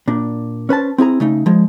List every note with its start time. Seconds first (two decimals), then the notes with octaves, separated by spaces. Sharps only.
0.08 A#2 D4
0.69 C#4 B4 C5 A5
0.98 C4 E4 G#4 A#5
1.20 C#3 A3 D#4
1.46 F3 G#3